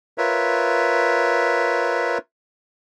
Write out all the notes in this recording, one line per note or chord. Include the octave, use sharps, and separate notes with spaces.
F4 A#4 B4 C#5 E5